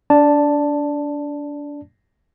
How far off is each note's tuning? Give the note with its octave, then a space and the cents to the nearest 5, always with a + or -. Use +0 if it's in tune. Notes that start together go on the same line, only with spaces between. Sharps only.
D4 -25 D5 +0 A5 +0